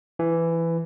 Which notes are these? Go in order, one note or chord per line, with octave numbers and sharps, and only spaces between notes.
E3